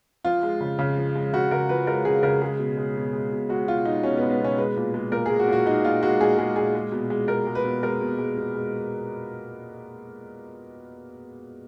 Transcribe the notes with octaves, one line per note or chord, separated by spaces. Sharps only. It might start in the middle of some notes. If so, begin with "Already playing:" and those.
F3 F4
G#3
C#3
C#3
F3
G#3
C#3 F#4
C#3 A#4
F3 B4
G#3 A#4
C#3 G#4
C#3 A#4
G#3 G#4
B2
G#3
B2
G#3
B2
G#3 F#4
B2 F4
G#3 D#4
B2 C#4
B3
G#3
B3
B2 C#4
G#3 B4
A#2
G#3
A#2 A#4
G#4
G#3
F#4
A#2
F#4
G#3 D#4
A#2 F4
G#3 F#4
A#2 G#4
G#3 G#4
A#2 G#4
G#3
B2
G#3
B2 A#4
G#3
B4
B2
G#3 A#4
B2
G#3
B2
G#3